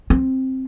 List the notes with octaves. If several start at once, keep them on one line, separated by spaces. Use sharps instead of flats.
C4